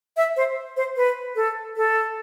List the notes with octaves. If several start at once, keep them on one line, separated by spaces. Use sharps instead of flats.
E5
C5
C5
B4
A4
A4